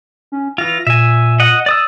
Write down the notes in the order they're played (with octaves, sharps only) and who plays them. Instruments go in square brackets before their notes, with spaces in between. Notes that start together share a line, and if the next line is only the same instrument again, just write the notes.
[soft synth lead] C#4
[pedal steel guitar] E3 F4 [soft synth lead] A#6
[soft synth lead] A#2 [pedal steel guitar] E5 G#5
[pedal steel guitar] D#5 F#5
D5 D#6 E6